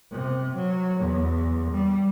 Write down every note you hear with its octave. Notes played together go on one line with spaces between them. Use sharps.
C3
F#3
E2
G3